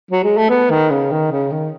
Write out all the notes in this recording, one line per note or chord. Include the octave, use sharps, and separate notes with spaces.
F#3
G#3
A3
B3
D#3
C#3
D#3
C#3
D#3